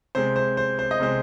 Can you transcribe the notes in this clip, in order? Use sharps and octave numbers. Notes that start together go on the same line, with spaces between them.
C3 G#3 C5
C5
C5
C5
D#5
C3 G#3 C5